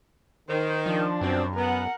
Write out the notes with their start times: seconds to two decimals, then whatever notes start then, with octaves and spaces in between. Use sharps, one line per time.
0.49 D#3 C5
0.86 F3 D4
1.21 F#2 B2 F3 C4
1.56 B3 A#4 F#5